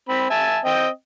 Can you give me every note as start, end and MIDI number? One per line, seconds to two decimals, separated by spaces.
0.09 0.30 60
0.09 0.30 83
0.30 0.58 76
0.30 0.58 80
0.30 0.58 81
0.65 0.88 60
0.65 0.88 75
0.65 0.88 79